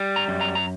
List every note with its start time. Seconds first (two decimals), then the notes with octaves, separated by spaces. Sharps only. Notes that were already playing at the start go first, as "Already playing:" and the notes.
Already playing: G3
0.16 A#5
0.28 F#2
0.41 A#5
0.55 A#5